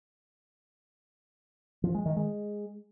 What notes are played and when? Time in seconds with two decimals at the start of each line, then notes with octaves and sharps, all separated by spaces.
1.84 F3
1.95 G#3
2.06 D#3
2.16 G#3